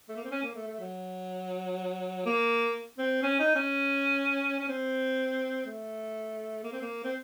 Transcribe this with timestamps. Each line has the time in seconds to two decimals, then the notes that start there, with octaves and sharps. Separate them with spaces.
0.09 A3
0.16 A#3
0.24 C4
0.31 C#4
0.43 A#3
0.55 A3
0.67 A3
0.80 F#3
2.26 A#3
2.99 C4
3.23 C#4
3.39 D#4
3.56 C#4
4.59 C#4
4.69 C4
5.66 A3
6.64 A#3
6.72 C4
6.82 A#3
7.04 C4